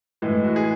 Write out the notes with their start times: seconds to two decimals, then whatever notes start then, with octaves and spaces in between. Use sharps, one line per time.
0.22 A2 E3 G#3
0.44 F#4
0.56 G#4